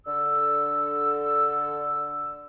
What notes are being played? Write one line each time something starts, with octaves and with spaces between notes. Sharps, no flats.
D3 E6